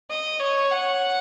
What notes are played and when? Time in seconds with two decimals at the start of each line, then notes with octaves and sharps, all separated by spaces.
0.10 D#5
0.40 C#5
0.71 F#5